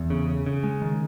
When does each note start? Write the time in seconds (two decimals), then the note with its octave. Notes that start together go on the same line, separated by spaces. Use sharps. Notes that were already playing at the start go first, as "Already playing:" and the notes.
Already playing: E2
0.10 C#3
0.28 C#3
0.46 C#3
0.64 G#3
0.82 D#3